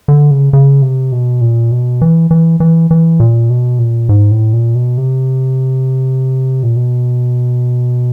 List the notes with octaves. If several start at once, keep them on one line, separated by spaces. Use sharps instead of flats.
D3
C#3
C#3
C3
B2
A#2
B2
E3
E3
E3
E3
A#2
B2
A#2
G#2
A2
A#2
B2
C3
A#2
B2